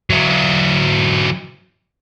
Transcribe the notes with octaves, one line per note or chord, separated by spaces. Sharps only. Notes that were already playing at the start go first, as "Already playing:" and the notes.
F#3 E4